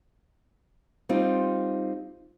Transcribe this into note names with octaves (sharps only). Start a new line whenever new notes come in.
G3 C4 D#4 F4